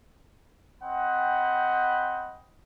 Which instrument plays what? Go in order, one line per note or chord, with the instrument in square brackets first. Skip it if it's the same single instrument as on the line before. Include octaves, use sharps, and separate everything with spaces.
[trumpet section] C4 D#5 F#5 G5 B5